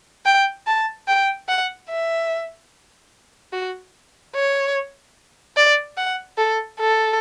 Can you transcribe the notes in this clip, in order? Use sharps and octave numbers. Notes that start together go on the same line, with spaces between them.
G5
A5
G5
F#5
E5
F#4
C#5
D5
F#5
A4
A4